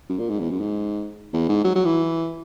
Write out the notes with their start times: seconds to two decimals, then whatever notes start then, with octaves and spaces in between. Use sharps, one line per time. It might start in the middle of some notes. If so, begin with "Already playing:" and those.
0.09 F#2
0.19 A#2
0.29 G#2
0.40 E2
0.50 F#2
0.60 G#2
1.33 E2
1.49 G#2
1.64 F#3
1.75 F#3
1.85 E3